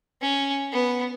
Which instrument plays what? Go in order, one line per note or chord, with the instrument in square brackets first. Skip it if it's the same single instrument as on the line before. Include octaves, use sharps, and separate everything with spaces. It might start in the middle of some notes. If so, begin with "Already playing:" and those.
[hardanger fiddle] C#4
B3